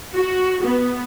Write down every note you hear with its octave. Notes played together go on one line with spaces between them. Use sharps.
F#4
B3